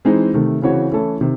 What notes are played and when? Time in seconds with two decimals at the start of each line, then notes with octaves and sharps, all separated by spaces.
0.05 E3 G#3 C4 D#4
0.34 C3 D#3 A3
0.62 C#3 E3 C4 F#4 C#5
0.92 E3 A3 C#4 E4 A4
1.21 C3 D#3